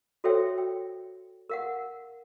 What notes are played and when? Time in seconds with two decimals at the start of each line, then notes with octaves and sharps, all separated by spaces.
0.24 F#4 A4 C5 C#5 E5 G5
0.58 G5
1.49 A#4 F5 F#5